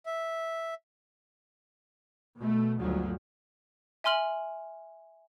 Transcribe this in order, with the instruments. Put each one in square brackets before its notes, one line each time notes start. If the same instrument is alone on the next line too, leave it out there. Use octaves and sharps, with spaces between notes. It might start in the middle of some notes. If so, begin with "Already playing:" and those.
[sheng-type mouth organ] E5
[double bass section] B2 A3
G1 D2 G#2 F3 F#3
[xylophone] E5 G#5 C6 F6 F#7